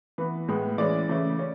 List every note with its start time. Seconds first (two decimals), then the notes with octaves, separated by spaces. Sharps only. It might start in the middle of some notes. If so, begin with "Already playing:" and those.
0.18 E3 B3 B4
0.48 A2 G#3 B3
0.78 E3 G#3 C#4 D5
1.09 C#3 E3 A3 C#4
1.39 C#4